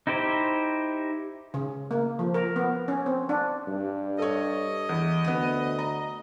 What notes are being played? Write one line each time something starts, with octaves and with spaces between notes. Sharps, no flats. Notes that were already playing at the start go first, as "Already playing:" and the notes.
D#4 E4 G4 C5
C#3
A#3
F3
A#4
B3
C#4
C4
D4
G2
A4 C#5 D#5
E2
D2 B3 D#7
A#5